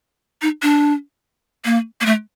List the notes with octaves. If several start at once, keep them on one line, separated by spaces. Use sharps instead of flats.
D#4
D4
A#3
A#3
A3